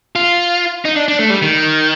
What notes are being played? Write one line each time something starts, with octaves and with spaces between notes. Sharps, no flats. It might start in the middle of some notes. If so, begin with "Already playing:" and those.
F4
D#4
D4
D4
A3
G3
D#3